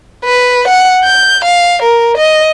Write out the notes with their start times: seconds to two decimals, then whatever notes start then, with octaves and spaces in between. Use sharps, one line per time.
0.25 B4
0.68 F#5
1.04 G6
1.45 F5
1.82 A#4
2.17 D#5